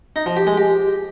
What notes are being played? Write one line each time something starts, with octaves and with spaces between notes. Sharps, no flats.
D#4
F3
G4
G#3
G4